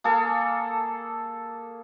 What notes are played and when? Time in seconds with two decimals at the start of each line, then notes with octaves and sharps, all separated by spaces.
0.04 A#3 G#4 A4